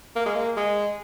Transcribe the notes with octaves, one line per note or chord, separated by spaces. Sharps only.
A#3
G#3
A#3
G#3